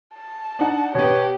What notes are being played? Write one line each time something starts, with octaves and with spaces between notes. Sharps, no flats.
A5
D4 D#4 F#5
B2 B3 G4 C#5